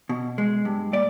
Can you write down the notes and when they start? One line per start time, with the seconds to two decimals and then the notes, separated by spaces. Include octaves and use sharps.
0.09 B2
0.38 G#3
0.65 G2
0.93 A#2 D5